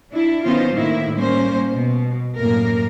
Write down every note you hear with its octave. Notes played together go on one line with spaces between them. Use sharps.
D4 E4
D#3 B3 C#4 D#4 F4 C5
A2 D#3 A#3 E4
G3 A#3 C#4 C5
B2
F#2 A2 A#3 A#4